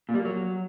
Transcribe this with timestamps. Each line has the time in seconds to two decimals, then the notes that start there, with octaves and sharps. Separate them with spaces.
0.09 A#2
0.14 G3
0.20 A#3
0.25 F#3